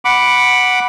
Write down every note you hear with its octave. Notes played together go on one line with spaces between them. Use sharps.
F#5 B5 D6